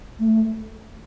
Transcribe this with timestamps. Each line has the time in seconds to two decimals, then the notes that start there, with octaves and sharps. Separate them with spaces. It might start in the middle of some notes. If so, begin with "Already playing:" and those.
0.20 A3